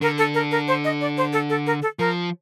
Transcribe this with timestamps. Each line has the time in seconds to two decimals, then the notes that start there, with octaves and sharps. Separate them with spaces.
0.01 D3 A#4
0.18 A4
0.34 A#4
0.51 A#4
0.68 C5
0.84 D#5
1.01 D5
1.18 C5
1.33 A4
1.50 A4
1.67 A#4
1.82 A4
1.99 F3 A#4